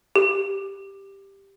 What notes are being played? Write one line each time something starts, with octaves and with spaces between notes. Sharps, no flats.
G4